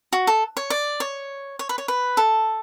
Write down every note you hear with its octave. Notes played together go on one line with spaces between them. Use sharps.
F#4
A4
C#5
D5
C#5
C#5
B4
C#5
B4
A4